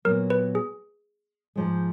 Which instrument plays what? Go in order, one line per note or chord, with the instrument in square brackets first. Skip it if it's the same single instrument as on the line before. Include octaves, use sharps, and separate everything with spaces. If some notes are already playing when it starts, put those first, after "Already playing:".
[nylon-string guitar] A#2 F#3 B3 [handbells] A#4
[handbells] B4
G#4
[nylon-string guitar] G#2 F3 G#3